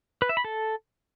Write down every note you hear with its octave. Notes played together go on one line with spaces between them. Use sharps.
B4
E5
B5
A4